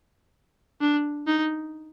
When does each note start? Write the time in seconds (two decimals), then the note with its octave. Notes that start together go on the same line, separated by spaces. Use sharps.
0.81 D4
1.27 D#4